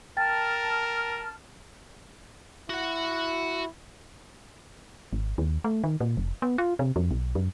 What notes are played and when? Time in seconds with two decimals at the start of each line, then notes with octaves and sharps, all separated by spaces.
0.17 A#4 G5 A5 F6 A6
2.70 E4 F#4 F#5
5.13 G#1
5.38 D#2
5.64 A3
5.84 D#3
6.00 A#2
6.17 F1
6.42 B3
6.58 F4
6.79 C3
6.96 F2
7.11 B1
7.35 F#2